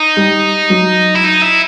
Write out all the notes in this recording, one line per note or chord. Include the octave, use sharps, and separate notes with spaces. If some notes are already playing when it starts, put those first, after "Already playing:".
Already playing: D#4
G3
F#3
E4
D#4
E4